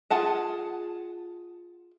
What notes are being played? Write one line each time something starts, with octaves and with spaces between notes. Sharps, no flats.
F4 G#4 F#5 A5